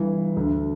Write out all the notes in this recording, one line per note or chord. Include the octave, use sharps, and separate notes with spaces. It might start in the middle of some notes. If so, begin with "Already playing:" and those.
Already playing: G1 G2 E3
D2 D3